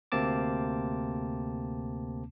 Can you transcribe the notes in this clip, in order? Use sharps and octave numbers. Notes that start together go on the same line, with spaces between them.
D2 C3 A#3 C4 A5 D6